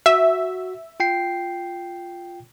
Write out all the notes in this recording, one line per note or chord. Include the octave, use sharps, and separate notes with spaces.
F#4 E5
F4 G5 C7